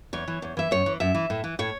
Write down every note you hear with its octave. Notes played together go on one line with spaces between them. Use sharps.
E2 C#5
E3
E2
E3 E5
F#2 C#5
E3
F#2 E5
E3
A2
E3
A2 C#5